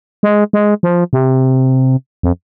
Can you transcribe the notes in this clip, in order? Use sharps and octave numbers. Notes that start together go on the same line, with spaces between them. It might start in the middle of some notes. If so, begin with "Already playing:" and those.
G#3
G#3
F3
C3
F2